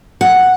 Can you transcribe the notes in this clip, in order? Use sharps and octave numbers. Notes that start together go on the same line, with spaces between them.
F#5